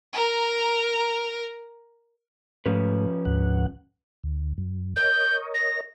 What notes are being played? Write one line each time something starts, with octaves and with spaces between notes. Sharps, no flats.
A#4 A#5
G#2 F3 A3 C#4 B4
D2 G#2 F#5
D2
F#2
A#4 C#5 D#5 G6
A#6